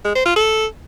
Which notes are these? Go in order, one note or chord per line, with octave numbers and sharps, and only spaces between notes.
G#3
C5
F4
A4